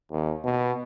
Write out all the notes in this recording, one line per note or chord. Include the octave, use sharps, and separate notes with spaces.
D#2
B2